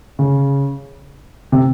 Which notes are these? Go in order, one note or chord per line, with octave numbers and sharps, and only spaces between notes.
C#3
C3